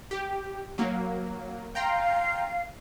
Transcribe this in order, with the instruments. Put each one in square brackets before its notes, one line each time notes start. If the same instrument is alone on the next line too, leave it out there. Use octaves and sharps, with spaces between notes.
[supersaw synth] G4
F#3 A#3
[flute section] F5 [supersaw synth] G5 A#5 C6